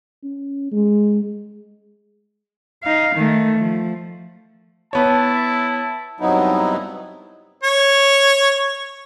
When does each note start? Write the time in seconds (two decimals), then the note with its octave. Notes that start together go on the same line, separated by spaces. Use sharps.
0.23 C#4
0.72 G#3
2.83 D#4 F5
3.15 D#3 A3
3.58 F3
4.93 B3 E4 C#5 A5
6.20 G2 C3 F#3 B3 D#4 E4
7.63 C#5